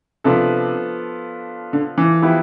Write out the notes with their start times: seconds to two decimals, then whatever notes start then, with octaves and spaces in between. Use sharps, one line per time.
0.24 C3 F3 B3 D4 F4 A4
1.73 D3
1.98 E3
2.22 F3 B3 E4 G4 B4